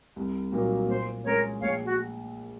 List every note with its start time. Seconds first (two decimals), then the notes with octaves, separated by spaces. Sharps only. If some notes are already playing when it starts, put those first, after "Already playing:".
0.16 C2
0.52 A#2 F#3 A#3 D#4
0.88 A#2 C5
1.24 G#3 C#4 A#4 C#5
1.61 A#1 C#5 F5
1.86 F#4